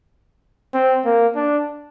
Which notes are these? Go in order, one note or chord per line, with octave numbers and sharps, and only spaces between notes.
C4
A#3
D4